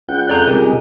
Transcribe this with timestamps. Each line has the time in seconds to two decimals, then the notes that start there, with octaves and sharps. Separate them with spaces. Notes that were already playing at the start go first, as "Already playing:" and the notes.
0.09 C#2 F#5 G5 G6
0.29 F2 D5 A#5
0.47 C3 D#3 G3 G4 G#4 D#5